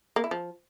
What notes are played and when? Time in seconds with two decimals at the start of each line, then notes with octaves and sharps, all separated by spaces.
0.16 A#3
0.24 E4
0.31 F3